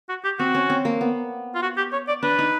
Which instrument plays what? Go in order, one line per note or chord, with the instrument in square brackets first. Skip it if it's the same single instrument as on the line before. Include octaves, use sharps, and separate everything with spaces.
[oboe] F#4
G4
[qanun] C4 [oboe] F#4
[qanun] C#4
C4
A#3
B3
[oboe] F4
F#4
G4
C#5
D5
[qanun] D4 [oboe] B4
[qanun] D#4